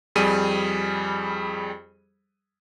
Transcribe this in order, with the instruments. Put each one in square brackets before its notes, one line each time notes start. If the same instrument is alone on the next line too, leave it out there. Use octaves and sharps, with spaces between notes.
[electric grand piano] F2 G3 G#4 D#7